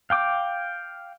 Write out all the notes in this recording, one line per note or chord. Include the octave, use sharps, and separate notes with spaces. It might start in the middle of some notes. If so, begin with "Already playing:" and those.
F5 G5 D6